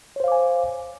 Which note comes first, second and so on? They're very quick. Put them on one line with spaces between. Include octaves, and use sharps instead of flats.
C#5 C5 F5 D6 G#5